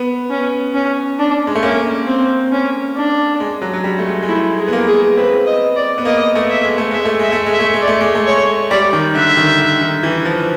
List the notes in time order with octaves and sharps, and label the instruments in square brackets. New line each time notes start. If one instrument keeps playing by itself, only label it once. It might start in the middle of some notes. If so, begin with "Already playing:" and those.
Already playing: [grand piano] B3
[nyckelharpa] C#4
C#4
D4
[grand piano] G#3
A3
[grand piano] A#3 [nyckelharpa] C#4
[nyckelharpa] C4
C#4
D4
[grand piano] G#3
F#3
F#3
G3
A3
G#3
G#3
[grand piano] A3 [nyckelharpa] E4
[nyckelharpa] G#4
[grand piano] B3
A#3
[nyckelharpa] G#4
[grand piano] C4 [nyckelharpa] B4
[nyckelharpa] D#5
D5
[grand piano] B3
[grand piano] A#3 [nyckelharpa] D#5
[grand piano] A3
[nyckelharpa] E5
[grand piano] G#3
A3
[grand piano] G#3 [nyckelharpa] E5
[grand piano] A3
[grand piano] G#3 [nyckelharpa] E5
[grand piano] A3
G#3
[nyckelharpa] E5
[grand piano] A3
G#3
[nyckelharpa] D5
[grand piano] A3
G#3
A3
[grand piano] G#3 [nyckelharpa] C#5
[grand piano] G3 [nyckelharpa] D5
[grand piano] D#3
[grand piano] D3 [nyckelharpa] E5
[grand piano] D#3
D3
D#3
E3
F3